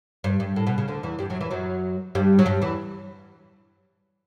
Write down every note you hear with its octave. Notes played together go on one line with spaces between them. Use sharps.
G2
G2
A2
B2
C#3
D2 D3
E2 E3
G2 G3
F#2 F#3
E2 E3
F#2 F#3
G2 G3
F#3
G2 G3
E2 E3